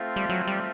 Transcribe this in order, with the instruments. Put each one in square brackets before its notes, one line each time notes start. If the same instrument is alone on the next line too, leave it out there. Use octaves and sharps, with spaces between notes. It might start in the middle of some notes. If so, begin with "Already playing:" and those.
Already playing: [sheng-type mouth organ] A3 C4 F4
[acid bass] G3
F#3
G3